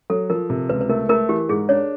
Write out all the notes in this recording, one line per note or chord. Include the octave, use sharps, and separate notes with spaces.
F#3 A4
F3 A#4
C3
C#2 B4
B4
A3 A#4
A3 A#4
E3 G4
G#2 G#4
D4 C#5